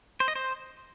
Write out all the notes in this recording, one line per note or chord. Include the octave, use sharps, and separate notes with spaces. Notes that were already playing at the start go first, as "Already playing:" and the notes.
C5
D#5
C5